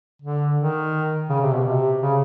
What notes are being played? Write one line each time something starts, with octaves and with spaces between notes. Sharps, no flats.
D3
D#3
C#3
C3
B2
C3
C#3